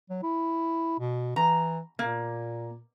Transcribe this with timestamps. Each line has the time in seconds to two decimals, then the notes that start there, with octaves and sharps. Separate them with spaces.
0.10 F#3
0.23 E4
0.99 B2
1.36 E3 A#5
1.99 A#2 A#3